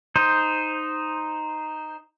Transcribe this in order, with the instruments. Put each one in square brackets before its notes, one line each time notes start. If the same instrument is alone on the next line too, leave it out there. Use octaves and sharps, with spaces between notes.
[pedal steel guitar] D#4 C5